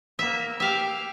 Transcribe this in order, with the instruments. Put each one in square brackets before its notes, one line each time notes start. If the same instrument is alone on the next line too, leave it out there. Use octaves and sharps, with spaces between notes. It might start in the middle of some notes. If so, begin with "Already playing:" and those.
[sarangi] A#3 [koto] E5
[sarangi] G4 [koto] E5 F5